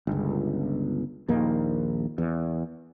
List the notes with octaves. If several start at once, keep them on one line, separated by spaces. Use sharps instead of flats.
G1 C#2
A#1 D#2 D#3 A#3
E2